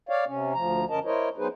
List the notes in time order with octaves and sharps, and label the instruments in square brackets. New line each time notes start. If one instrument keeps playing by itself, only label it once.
[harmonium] C#5 D5 F5
C3 C#4
D2 F3 A#5
F#2 D3 C#4 A#4 D#5 A5
E4 A#4 C5 C#5 D#5
F#3 B3 D#4 G#4 B4 C5